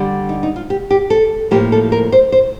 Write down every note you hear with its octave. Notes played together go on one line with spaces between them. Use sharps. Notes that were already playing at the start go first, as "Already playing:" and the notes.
Already playing: D3 G3 D4
D#4
D#4
F4
G4
G4
A4
A2 F3 A#3 G4
A4
A#4
C5
C5